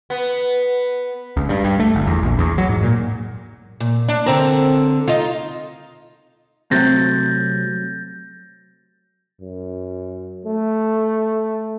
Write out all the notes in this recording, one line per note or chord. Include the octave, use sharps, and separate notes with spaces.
B3
C#2
G2
G2
A3
G1
E2
A#1
E2
F#3
G#2
A#2
A#2
D4
D3 C4 A#4
D#4 F4
C3 F#3 A3 G6 A6 A#6
F#2
A3